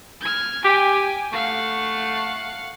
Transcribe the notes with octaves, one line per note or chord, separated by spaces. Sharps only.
F6 G#6
G4 G5 G#5
A3 F5 F#5